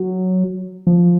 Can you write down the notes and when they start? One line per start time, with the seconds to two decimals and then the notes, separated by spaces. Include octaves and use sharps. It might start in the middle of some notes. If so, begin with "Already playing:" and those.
Already playing: F#3
0.87 F3